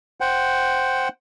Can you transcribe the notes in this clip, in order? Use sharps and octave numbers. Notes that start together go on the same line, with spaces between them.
C5 F#5 G5